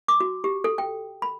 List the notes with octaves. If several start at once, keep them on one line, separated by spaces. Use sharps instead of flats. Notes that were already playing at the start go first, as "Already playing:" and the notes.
D6
F#4
G4
A4
G5
B5